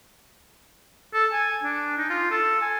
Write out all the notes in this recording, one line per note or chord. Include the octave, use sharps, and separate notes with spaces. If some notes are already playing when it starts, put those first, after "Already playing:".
A4
G#5
D4
D#4
F4
A4
G#5